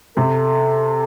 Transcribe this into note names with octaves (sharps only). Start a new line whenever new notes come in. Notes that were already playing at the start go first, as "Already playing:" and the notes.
C3 A4